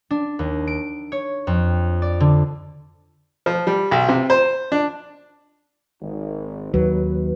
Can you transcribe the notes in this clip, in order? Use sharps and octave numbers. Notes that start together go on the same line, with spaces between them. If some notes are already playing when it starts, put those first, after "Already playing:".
D4
D#2
D7
C#5
F2
D5
D3
F3
G3
B1
C3
C5
D4
G#1
D#2 F#3 B4